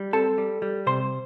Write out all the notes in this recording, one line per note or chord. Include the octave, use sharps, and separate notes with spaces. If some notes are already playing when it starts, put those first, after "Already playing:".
Already playing: G3
C4 A4 A5
G3
G3
C3 C5 C6